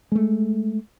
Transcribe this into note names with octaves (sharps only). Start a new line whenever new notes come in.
G#3 A3